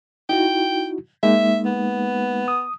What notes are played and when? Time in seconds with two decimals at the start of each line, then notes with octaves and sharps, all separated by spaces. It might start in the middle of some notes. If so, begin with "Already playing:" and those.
0.29 D#4 E4 F#4 G5
1.23 G#3 A#3 D#4 E5
1.65 B3
2.48 D#6